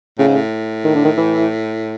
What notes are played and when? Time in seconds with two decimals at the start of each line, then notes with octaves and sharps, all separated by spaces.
0.18 A2 C#3
0.27 G#2
0.35 A2
0.84 D#3
0.95 D3
1.05 D#3
1.17 E3